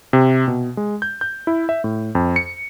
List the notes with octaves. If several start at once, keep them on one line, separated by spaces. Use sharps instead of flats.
C3
B2
G#3
G6
G6
E4
E5
A2
F2
C#7